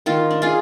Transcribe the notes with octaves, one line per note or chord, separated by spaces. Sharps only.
D#3 F4
D4
F4 G#4